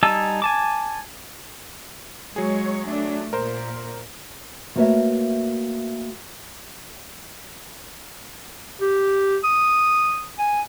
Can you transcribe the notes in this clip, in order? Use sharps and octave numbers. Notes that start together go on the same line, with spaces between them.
G3 D#4 G#5 A5 E6
G#5 A5 D6
F#3 G#3 G#4 C#5
A3 D4
A#2 A#4 C5
A3 A#3 F#4 B4 C#5 E5
G4
D#6
G#5